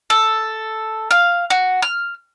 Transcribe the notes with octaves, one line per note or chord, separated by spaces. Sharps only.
A4
F5
F#4
F6